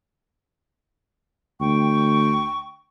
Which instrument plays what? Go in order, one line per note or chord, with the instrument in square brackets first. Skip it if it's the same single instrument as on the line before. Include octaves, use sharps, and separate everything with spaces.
[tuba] D2 [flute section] G5 C#6